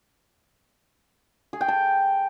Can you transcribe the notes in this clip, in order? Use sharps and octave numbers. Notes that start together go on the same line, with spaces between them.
G#4
G5
A5